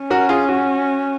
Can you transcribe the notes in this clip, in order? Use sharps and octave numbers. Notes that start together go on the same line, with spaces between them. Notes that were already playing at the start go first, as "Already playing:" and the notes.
Already playing: C#4
F#4 A#4
F4 G#4
F#4